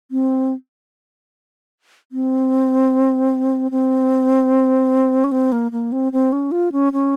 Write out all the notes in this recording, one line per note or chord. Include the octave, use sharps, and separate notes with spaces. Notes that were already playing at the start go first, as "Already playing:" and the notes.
C4
C4
C4
C#4
C4
A#3
A#3
C4
C4
C#4
F4
C#4
C#4